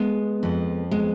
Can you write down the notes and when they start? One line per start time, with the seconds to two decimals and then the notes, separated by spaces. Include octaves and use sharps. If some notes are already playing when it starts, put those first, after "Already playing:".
Already playing: G#3 B3
0.43 F2 F3
0.91 G#3 B3